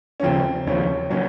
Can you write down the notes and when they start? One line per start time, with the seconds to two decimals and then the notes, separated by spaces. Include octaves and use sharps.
0.20 C#4
0.23 D#2 C#3 F3 C4
0.67 D#2 C#3 F3 C#4
1.10 A#2 F#3 C#4